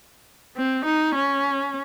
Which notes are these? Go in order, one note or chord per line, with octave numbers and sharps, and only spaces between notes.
C4
D#4
C#4